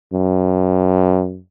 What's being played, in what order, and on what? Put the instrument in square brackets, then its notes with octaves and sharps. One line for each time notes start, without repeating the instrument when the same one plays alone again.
[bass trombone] F#2